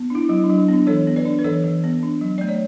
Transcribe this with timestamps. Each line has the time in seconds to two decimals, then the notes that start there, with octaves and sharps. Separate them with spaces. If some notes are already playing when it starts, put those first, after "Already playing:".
Already playing: B3
0.10 D4 E4
0.29 F#3 E4
0.44 D4
0.50 F#3
0.58 D4
0.68 B3 D4
0.87 E3 A4 C#5
1.07 B3
1.16 B4 D5
1.25 D4
1.39 B4
1.44 E3 A4 C#5
1.64 E3
1.84 B3
2.03 D4
2.21 F#3
2.38 A3 D5
2.49 C#5